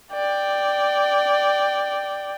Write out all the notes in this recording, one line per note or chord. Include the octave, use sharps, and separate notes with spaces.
D5 G5